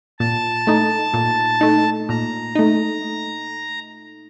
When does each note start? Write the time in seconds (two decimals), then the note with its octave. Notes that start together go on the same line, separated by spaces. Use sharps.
0.19 A#2 A5
0.67 A3 D#4
1.14 A#2
1.61 A3 D#4
2.09 A#2 A#5
2.55 A3 D#4